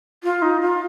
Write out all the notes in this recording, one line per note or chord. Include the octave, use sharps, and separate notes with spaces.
F4
D#4
F4